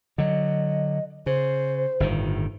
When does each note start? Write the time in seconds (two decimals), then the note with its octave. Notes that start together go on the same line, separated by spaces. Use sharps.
0.18 D3 F#3 D#5
1.26 C#3 C5
2.00 G1 A2 D#3